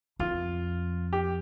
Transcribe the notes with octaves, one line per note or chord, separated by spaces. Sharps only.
F2 F4
G4